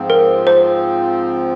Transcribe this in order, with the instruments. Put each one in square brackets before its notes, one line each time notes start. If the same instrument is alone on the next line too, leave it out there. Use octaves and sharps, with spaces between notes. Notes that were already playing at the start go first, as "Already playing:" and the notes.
Already playing: [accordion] G#2 F3 C4
[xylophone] A#4
C5